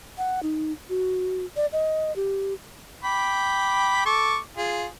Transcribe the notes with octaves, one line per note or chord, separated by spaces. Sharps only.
F#5
D#4
F#4
D5
D#5
G4
G5 B5 D6
A4 C#6 D6
F4 G#4